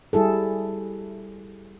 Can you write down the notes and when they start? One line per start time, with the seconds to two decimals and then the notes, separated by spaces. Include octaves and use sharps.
0.13 G3 E4 G#4 A4